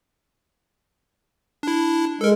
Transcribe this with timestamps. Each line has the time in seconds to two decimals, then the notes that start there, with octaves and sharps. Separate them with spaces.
1.63 D4 E4
2.21 G#3 A4 A#4